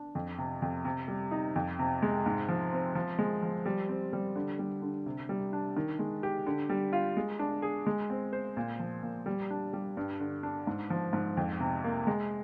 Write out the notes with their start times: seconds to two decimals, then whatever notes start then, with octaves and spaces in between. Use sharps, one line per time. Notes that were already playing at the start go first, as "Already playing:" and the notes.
Already playing: D4
0.15 F2
0.38 C3
0.62 F2
0.85 C3
1.08 G3
1.31 D#4
1.56 F2
1.79 C3
2.02 G#3
2.26 G#2
2.49 F3
2.73 C4
2.95 F3
3.19 G#3
3.42 F3
3.66 G3
3.89 C4
4.13 G3
4.35 D3
4.59 G3
4.82 D3
5.06 C3
5.29 G3
5.53 D4
5.77 D#3
5.99 G#3
6.23 G4
6.46 D3
6.69 G3
6.93 F4
7.17 G#3
7.39 D4
7.62 G#4
7.87 G#3
8.10 C4
8.33 C5
8.57 A#2
8.80 F3
9.03 A#2
9.26 G3
9.50 D4
9.73 G3
9.97 G2
10.20 D3
10.43 D4
10.67 G#2
10.90 F3
11.13 G#2
11.37 F2
11.60 C3
11.84 A#3
12.07 G#3